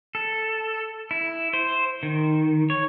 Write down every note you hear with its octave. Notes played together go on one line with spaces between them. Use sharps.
A4
E4
C5
D#3
C#5